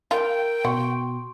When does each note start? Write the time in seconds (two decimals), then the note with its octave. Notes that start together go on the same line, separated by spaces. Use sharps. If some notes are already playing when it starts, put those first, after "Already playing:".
0.11 F4 A#4 G5
0.65 B2 F#5 C6 C#6